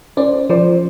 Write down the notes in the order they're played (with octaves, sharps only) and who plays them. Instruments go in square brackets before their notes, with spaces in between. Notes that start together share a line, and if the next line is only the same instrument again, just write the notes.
[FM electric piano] C#4 [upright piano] C5 D5
[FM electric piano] F3 [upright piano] C5 D5